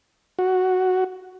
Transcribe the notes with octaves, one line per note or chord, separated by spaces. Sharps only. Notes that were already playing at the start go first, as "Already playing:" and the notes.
F#4